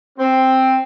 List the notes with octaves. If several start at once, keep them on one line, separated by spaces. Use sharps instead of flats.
C4